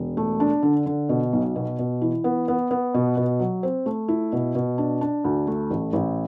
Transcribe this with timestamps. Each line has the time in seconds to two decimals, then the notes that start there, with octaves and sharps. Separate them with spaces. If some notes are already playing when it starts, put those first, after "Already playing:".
Already playing: E1
0.17 A3
0.40 D4
0.63 D3
0.86 D3
1.09 B2
1.33 B1
1.56 B2
1.79 B2
2.02 E3
2.24 B3
2.48 B3
2.71 B3
2.94 B2
3.17 B2
3.40 F#3
3.63 C4
3.86 A3
4.08 E4
4.33 B2
4.55 B2
4.78 D4
5.01 D4
5.24 D2
5.47 A3
5.70 A1
5.93 A1